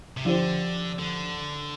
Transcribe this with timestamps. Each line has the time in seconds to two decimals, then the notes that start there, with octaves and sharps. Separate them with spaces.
0.17 C3
0.25 D3 F3 D4 G4 C5
0.99 D3